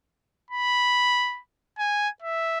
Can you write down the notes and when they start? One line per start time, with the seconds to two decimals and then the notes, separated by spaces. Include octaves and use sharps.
0.51 B5
1.79 G#5
2.22 E5